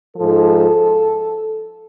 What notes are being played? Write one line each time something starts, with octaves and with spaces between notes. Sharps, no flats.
G#2 F3 A4